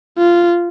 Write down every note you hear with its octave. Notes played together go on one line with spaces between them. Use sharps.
F4